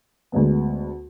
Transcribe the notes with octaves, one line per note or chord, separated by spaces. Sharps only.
D2 D3 G#3 B3